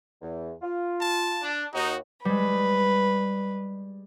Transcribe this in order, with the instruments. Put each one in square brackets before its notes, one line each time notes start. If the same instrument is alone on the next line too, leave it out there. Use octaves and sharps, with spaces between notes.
[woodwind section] E2
F4
[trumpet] A5
[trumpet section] D4
[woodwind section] D#2 [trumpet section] D#4 [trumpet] F#4
[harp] G3 G#3 [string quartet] B4